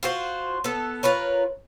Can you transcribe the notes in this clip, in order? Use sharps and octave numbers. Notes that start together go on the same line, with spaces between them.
F4 F#4 C5
B3 A4
F4 A#4 B4 C#5